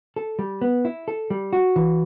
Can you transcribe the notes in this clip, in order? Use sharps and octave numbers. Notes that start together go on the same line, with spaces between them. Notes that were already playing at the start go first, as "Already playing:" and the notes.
A4
G3
B3
E4
A4
G3
F#4
E3